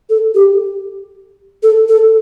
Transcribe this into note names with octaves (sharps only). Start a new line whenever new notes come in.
A4
G4
A4
A4